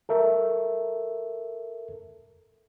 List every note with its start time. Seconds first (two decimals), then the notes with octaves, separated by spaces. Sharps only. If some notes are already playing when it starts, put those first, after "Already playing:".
0.09 A4 A#4 E5